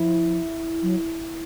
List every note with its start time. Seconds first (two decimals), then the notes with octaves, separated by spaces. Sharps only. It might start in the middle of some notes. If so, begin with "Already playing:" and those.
Already playing: F3 E4
0.82 F#3